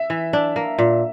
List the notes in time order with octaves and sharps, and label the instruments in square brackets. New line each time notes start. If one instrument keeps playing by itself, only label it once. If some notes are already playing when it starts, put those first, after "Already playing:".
Already playing: [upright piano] E5
[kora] E3
D4
A#3
A#2